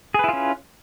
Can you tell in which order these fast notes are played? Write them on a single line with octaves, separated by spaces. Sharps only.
G#4 B4 E4 F4 C#4